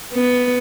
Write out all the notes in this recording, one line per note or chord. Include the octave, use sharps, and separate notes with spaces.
B3